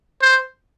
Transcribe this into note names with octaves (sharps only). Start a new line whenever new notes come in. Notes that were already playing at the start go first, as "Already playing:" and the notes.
C5